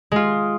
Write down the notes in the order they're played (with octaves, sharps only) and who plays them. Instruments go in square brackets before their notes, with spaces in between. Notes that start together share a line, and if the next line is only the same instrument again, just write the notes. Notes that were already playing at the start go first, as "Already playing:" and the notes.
[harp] G#3 F4